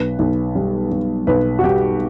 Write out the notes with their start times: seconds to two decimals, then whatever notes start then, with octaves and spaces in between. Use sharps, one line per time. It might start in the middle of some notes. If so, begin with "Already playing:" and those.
Already playing: B1 B4
0.19 B1
0.55 G3
0.91 G3
1.27 B1 B4
1.59 F#4
1.64 G3 G4